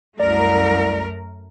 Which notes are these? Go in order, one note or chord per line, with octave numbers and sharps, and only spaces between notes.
C2 F#2 A3 A#4 D5